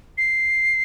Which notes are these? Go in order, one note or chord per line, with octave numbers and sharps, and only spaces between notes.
C7